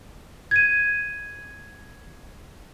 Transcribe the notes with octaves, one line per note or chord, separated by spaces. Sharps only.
G#6 D#7